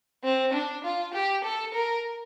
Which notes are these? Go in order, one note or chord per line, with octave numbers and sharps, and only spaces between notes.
C4
D4
F4
G4
A4
A#4